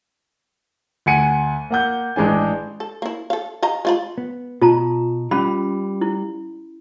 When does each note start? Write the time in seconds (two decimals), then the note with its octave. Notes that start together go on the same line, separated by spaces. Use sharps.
1.06 D2 F#5 G#5 C#7 D#7
1.70 A#3 F#5 G6
2.16 A1 G#3 D4 G#5
2.80 A4
3.02 A#3 E4
3.30 A4 F5
3.62 D#5 F5 A#5
3.85 G#3 F4 B5
4.18 B3
4.62 B2 F4 A5 A#5
5.31 G3 C#4 F4 B5
6.01 E4